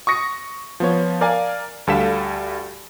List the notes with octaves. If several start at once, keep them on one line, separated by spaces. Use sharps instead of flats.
C#6 D#6 A#6 C#7
F3 B3 C#5
A#4 D5 F5 G#5
D2 G3 A4 F5 B6 E7